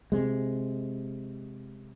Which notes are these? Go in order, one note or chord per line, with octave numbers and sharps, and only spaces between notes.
C3 G#3